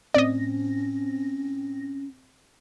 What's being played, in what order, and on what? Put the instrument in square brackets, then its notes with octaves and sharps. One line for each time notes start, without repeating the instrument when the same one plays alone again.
[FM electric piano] A2 C4 A#6 [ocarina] C#4 [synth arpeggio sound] D5 D#5